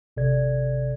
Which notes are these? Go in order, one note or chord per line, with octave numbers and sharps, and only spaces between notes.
G#1 C3 A4 D5 G#6